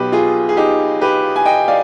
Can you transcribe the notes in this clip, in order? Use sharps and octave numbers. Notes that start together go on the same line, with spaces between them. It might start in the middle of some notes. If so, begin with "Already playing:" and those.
Already playing: B1 B2 G4 B4
F4 G#4
G#4
D#4 G4
G4 B4
G#5
D#5 G5
D5 F5